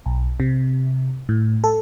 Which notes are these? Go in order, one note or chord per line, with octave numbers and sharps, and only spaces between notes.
B1
C3
A2
A4